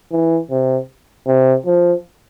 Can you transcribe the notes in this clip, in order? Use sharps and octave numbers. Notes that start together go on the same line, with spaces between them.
E3
C3
C3
F3